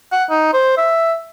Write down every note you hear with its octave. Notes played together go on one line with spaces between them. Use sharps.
F#5
D#4
C5
E5